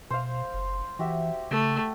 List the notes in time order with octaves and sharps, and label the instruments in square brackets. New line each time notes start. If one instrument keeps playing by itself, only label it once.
[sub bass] B2 [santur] C5 F5
[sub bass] F#1
[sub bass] E3 [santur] F#4 G4 E5
[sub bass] C#3 [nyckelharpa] A3